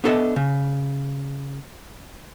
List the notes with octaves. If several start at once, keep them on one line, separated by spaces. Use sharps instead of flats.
B3 D4 A4 D#5 E5
C#3